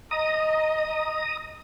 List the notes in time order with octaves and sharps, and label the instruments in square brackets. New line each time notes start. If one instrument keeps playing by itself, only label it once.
[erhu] D#5 [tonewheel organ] A#5 D#6